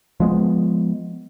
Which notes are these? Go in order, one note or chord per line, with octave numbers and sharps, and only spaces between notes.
F3 G#3 B3